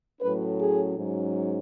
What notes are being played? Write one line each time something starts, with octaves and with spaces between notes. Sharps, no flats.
A2 F#3 A3 C#4 B4
G#4
G#2 F#3 C#4